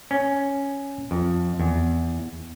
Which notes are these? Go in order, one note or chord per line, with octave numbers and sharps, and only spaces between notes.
C#4
F2
E2